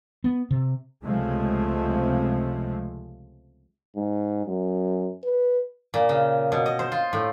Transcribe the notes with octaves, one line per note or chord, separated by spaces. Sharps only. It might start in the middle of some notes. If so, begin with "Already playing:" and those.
B3
C3
C#2 C3 F3 G#3 A3
G#2
F#2
B4
A#2
C#3
B2
D#5
C5
F4
A2